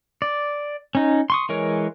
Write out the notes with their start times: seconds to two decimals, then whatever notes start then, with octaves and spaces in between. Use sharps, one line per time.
0.22 D5
0.95 C#4 D#4
1.30 C6 C#6 D#6
1.49 E3 G#3 A#4 C#5